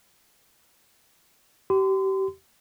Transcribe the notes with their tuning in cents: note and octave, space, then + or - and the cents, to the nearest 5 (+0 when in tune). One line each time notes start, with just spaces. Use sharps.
G4 -30 C6 -35